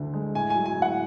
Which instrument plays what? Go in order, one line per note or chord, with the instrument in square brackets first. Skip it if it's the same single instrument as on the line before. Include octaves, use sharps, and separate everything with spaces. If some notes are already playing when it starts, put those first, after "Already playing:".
Already playing: [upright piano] D2 D3
G#3
[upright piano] A2 [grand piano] G#5
[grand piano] G#5
[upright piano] F#3
[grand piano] G#5
[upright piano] A2
[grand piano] F#5